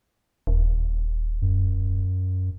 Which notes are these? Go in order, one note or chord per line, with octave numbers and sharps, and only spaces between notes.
D#1
F#2